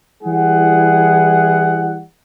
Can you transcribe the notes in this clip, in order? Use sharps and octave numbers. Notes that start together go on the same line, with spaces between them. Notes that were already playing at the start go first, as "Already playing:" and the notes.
E3 G3 E4 G#4 F#5